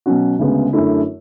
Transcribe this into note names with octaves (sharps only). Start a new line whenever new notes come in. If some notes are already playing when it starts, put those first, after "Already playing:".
B2 F#3 C#4 F#4
D2 C#3 G#3 B3
F#2 D3 A3 E4